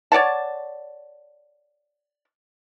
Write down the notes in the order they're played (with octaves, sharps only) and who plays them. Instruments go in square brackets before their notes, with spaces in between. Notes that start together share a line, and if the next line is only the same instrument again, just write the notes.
[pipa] C#5 D5 F#5 A5